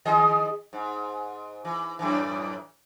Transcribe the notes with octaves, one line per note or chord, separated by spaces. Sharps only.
D#3 G#4 D#5
G#2
E3
F#2 A2 E3